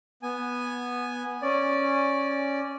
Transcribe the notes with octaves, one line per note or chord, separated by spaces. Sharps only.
B3 G#5
C#4 D5